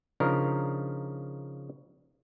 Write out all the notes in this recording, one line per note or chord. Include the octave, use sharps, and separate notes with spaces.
C#3 F3 D4 D#4 A#4